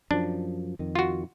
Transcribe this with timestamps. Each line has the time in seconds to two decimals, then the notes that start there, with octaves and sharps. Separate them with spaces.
0.11 F#2 F3 D4
0.79 F2 D#3
0.95 F4 F#4